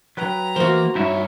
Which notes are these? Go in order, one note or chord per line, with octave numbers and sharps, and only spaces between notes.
F#3 B4 G5 A#5
E3 A#3 F#4 C5
G2 D#4 E4 C#5 E5